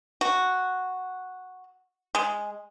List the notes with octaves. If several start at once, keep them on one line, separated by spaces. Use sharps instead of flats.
F#4
G#3